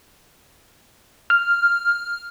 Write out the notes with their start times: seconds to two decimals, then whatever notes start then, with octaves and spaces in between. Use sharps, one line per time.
1.30 F6